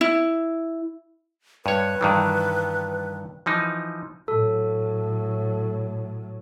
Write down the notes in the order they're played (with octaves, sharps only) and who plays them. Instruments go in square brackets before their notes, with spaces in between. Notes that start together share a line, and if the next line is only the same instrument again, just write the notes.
[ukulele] E4
[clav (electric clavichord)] G2 C#5 [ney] B4
[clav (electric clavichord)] G2 D#3 E3
E3 F3 D#4
[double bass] A2 F#3 [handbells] A4